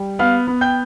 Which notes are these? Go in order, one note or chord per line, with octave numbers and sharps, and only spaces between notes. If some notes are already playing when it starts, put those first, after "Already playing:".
Already playing: G3
B3 F5 F6
B3
G5 G6